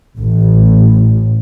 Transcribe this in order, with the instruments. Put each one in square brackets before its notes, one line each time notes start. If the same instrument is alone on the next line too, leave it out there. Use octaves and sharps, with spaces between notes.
[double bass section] A1